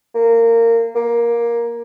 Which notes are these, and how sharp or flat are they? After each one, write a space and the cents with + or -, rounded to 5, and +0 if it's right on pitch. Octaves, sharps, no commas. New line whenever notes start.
A#3 -20
A#3 +15